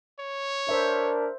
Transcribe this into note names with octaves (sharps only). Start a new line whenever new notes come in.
C#5
D4 A#4 C5 E5